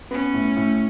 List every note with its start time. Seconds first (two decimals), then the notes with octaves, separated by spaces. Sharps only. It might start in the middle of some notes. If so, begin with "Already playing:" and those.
0.11 B3 C#4
0.34 A2
0.56 A2